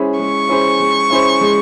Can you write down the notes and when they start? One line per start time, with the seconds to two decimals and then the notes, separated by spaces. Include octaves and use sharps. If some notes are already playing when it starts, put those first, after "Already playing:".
Already playing: G#3 C#4 E4 G#4 C5
0.19 G#3 C#6
0.49 C#4 E4 G#4 C5
0.80 G#3
1.10 C#4 E4 G#4 C5
1.41 G#3